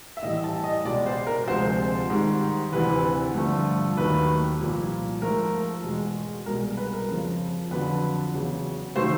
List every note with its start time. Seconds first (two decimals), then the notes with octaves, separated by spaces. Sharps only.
0.17 E5
0.23 A2 E3 G3 D#5
0.44 A5
0.64 D#5
0.85 C#2 B2 G#3 D5
1.06 C5
1.27 A#4
1.48 D2 C3 F3 G#3 C5
2.10 G#2 D#3 G3
2.72 D2 C3 E3 B4
3.35 G2 D3 F3 A3
3.97 D#2 D#3 F#3 A3 B4
4.59 C2 A#2 F3
5.22 G#2 F3 A3 A#4
5.84 E2 B2 G#3
6.46 C2 B2 G#3 A#4
6.77 B4
6.93 A#4
7.09 F2 C#3 F3
7.71 F2 D3 F#3 B4
8.34 E2 C#3 F#3
8.96 C3 D#3 F#3 A3 C5